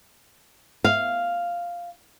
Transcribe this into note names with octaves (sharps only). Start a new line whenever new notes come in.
F5